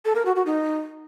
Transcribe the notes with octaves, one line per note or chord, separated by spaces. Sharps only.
A4
A#4
F#4
F#4
D#4